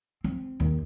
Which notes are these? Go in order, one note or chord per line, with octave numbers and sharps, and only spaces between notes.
C4
D#2